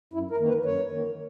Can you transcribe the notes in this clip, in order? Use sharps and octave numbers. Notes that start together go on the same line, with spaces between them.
F#2 E4
A#4
D#3 A#3
B4
F#2 C#5
D#3 A#3